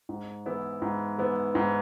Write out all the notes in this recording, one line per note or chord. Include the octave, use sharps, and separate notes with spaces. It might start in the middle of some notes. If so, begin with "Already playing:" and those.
G#2
E3 B3 E4
G#2
E3 B3 E4
G#2